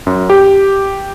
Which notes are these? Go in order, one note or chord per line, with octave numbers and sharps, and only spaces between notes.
F#2
G4